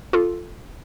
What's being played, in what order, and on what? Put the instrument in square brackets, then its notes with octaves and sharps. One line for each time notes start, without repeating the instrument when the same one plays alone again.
[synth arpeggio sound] F4 A4